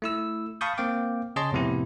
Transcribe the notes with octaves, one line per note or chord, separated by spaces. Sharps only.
A3 E4 E6
F5 A5 B5 C#6 D#6 G6
A#3 C4 F5 G5 D6
C#3 G#4 C#5 D#5 A5 C6
F2 A2 C3 B3 E4